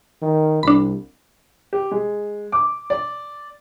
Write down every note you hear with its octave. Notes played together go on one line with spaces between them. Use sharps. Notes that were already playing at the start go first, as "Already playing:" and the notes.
D#3
C2 D4 B5
G4
G#3
D6
D5